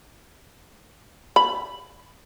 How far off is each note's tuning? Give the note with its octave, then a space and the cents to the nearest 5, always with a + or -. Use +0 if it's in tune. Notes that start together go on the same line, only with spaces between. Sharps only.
B5 -5